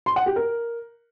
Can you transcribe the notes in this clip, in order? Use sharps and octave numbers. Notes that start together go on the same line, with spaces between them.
C6
F#5
G4
A#4